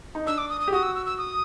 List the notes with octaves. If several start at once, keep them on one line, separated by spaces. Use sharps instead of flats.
D#4
D4 E6
D6
D#6
D#6
G4
F#4 D#6
E6
E6
E6
D#6